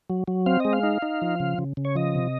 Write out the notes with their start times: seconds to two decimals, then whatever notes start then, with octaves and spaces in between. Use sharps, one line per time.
0.10 F#3
0.28 F#3
0.46 C4 F5
0.60 G#3 D#5
0.73 F5
0.83 D#4
1.02 D#4
1.22 F3
1.40 C#3
1.58 C#3
1.77 C#3
1.85 C#5
1.95 F3 D#5
2.15 C3